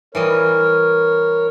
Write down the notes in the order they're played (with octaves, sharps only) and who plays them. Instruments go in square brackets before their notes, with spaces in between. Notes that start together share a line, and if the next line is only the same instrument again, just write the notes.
[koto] E3 G3 D#5 [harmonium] A#4 C#5